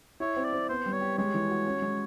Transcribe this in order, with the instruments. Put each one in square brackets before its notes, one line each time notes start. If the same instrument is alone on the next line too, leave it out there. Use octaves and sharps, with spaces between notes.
[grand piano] E4 [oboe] C#5
[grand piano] C4
[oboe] D5
[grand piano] C4
[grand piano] B3 [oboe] C5
[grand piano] G3
[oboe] C#5
[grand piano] G4
[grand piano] G#3 [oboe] C#5
[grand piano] E3
F#4
C#4
G#3